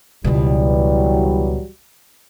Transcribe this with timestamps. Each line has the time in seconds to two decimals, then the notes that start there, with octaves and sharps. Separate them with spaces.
0.24 C#2 B2 E3 F#3 G3